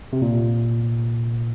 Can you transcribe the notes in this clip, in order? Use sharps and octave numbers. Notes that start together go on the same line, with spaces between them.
C3
A#2